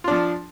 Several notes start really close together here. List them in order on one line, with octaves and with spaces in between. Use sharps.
F4 D4 F3